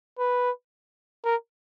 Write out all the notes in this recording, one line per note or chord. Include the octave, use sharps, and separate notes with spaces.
B4
A#4